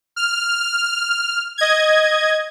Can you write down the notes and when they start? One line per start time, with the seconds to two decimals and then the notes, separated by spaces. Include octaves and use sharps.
0.16 F6
1.57 D#5 G#6